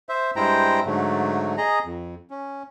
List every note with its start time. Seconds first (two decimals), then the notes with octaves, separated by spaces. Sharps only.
0.09 C5 E5
0.36 G2 G#3 E4 C5 G5 A#5
0.86 G#2 D3 F#3 A3
1.58 G#4 D#5 A#5
1.84 F2
2.30 C#4